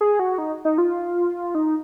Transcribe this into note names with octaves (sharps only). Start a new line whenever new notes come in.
G#4
F#4
D#4
D#4
F4
D#4